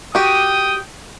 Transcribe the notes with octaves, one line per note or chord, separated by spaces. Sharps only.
F#4 G4 G5 D#6